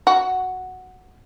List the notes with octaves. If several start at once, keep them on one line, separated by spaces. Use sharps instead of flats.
F#4